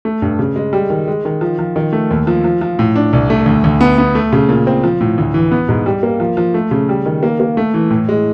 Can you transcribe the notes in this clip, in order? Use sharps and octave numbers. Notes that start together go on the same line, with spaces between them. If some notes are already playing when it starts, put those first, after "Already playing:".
A3
G2
C#3
G#3
G3
D#3
G#3
D#3
F3
F3
D#3
A3
D#2
F3
F3
F3
A2
D4
C2
A3
D2
D2
B3
B3
A3
C#3
A#2
C4
F3
A2
D2
E3
B3
G#2
G3
A#3
F3
F3
A3
C#3
G3
D#3
A#3
A#3
A3
E3
A2
G#3